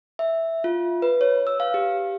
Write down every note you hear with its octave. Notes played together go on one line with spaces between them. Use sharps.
E5
F4
B4
C#5
E6
F5
G4